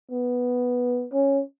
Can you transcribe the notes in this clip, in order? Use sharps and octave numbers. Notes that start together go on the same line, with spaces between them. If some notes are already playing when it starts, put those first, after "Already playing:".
B3
C#4